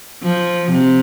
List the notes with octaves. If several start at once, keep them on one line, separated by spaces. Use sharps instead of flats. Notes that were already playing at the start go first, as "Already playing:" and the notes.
F3
C3